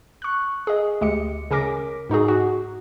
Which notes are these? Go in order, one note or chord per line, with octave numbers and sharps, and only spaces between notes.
C#6 F#6
G#4 D#5
D2 G#3 G4 D#5 C#7
C#3 C#4 A#4 D6 A#6 B6
G#2 D#4 F#4 G#4
F#4 F#5